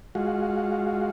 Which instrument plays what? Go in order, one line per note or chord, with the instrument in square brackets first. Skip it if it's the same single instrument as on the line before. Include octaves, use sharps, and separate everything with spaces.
[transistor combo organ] G#3 F4 F#4